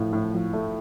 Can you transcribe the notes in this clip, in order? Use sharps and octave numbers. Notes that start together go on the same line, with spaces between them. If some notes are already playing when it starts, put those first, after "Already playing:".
Already playing: A2 F3 A3
A2
F3
A3